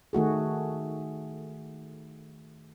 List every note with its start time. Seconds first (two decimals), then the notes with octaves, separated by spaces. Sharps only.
0.13 D#3 A3 F#4 G#4